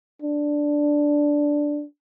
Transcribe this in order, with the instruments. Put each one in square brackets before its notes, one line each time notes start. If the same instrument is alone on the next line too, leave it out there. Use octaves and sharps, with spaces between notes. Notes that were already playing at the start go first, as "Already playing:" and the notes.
[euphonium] D4